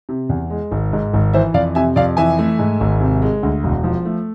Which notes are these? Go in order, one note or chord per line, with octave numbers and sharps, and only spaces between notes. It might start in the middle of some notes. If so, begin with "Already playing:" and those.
C3
E2
G#3
G#1
G#2
G#1
E3 C5 E5
F2 D5 F5
C3 E5 G#5
F2 D5 F5
E3 E5 G#5
A3
G#2
G#1
C3
G#3
D2
E1
F3
A3